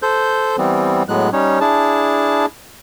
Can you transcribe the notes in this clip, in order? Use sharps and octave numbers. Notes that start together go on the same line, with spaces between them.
A4 C5 G6
E3 G3 B3 C4
A2 F#3 G#3 B3 F#6
G3 C#4 D#4 C#5
D4 E4 G#4 A5